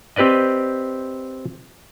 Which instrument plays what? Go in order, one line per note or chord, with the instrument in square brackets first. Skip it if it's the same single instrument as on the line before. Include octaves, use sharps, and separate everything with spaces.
[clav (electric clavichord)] C4 G4 B4 D5 D#5